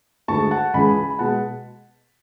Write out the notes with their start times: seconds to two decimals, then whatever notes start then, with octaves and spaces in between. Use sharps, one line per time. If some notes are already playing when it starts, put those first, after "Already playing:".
0.28 D2 D3 G#3 A5 C#6
0.51 F#5 A5
0.74 C#2 C#3 E3 G#3 G#5 B5
1.10 B5
1.19 B2 G#3 F#5 A5